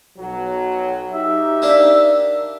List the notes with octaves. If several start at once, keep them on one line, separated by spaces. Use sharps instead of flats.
B1 F#3
D#4 G4 E5
A#3 D4